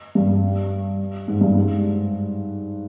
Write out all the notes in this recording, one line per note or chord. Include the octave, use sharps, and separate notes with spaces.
G2
G#2
G2
G#2